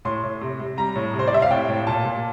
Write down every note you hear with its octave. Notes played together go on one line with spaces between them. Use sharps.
A2 C6
A2
C3
C3
G3 A#5
A2
C3
C5
D5
C3 E5
F5
A2 G5
A2
A#2 A5
A#2